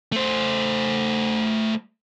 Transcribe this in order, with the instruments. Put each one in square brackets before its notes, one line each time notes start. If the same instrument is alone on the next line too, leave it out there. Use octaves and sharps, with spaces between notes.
[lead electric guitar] A3 C5